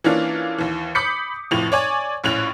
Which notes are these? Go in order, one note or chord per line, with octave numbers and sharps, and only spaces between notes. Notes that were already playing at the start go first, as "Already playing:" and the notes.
E3 A#3 C#4 D4 F4
D#2 E3
B5 D6 D#6 G6 B6 C#7
F1 A2 F3 F7
C#5 D5 G#5
A#1 A2 C#4 C#5 F#6 F7